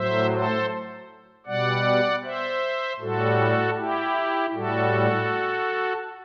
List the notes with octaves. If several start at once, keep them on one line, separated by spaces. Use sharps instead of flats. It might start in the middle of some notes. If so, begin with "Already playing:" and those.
Already playing: A2 F#3 C5 E5
A4 C5
B2 G3 D5 F#5
C5 E5
A2 G3 F#4 A4
E4 G4
A2 G3 F#4 A4